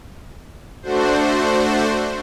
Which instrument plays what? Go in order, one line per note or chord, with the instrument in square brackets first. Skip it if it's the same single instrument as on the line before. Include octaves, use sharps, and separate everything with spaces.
[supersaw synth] A3 D4 F#4 C5